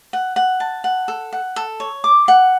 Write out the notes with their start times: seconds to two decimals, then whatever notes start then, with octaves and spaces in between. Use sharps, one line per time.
0.13 F#5
0.36 F#5
0.60 A5
0.84 F#5
1.08 A4
1.33 F#5
1.56 A4
1.80 C#5
2.04 D6
2.28 F#5